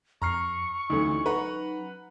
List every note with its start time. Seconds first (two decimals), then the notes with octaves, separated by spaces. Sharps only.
0.22 F2 A#5 C#6 F6 C7
0.90 D2 E3 F#3 C#4 D#4
1.26 B4 F#5 A#5